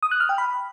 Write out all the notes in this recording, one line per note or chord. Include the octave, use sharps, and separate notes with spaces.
D#6
F#6
F6
G5
B5